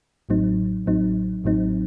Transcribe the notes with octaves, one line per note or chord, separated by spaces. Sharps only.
A1 A2 F#3 C4 D#4
A1 A2 F#3 C4 D#4
A1 A2 F#3 C4 D#4